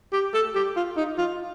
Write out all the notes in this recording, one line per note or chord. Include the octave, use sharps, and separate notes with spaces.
G4
A4
G4
F4
D#4
F4